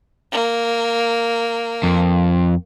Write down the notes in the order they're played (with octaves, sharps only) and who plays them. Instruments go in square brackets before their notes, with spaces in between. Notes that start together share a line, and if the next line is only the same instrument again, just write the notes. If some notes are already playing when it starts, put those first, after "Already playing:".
[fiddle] A#3
[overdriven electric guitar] F2